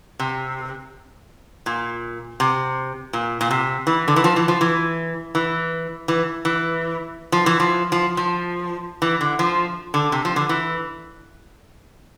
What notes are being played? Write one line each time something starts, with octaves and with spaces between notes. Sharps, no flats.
C3
A#2
C3
A#2
A#2
C3
E3
D3
E3
F3
E3
F3
E3
E3
E3
E3
F3
E3
F3
F3
F3
E3
D3
F3
D3
C3
F3
D3
E3